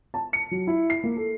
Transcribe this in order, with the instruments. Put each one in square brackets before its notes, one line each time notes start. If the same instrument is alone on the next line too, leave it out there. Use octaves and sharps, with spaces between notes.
[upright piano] A5
C#7
F#3
E4
C7
A#3
A4